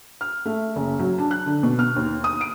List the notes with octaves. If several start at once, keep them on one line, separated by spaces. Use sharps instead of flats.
F6
A3
F#1
F#3
D4
F#6
D3
B2
F6
D#2
D#6
D7